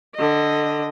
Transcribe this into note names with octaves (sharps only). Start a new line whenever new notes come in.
D3 D#5